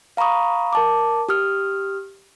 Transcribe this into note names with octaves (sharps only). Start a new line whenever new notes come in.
F5 A#5 B5 C#6 D#6
A#4 A5 D6
G4 D#6 F6